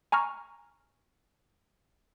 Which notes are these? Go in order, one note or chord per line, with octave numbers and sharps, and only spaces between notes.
G#5 A#5 C#6 F6